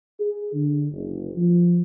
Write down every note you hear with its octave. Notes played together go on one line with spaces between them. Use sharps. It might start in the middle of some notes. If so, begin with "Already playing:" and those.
G#4
D3
F#1
F3